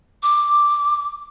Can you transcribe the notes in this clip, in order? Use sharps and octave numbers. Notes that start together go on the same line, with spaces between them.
D6